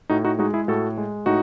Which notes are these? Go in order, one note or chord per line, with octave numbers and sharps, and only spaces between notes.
A2 D#4 F#4
D#4 F#4
G#3 D#4 F#4
E4 G#4
A2 F#4 A4
G#3
A2 D#4 F#4